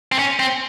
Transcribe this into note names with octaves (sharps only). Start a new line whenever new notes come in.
C4
C#4
C4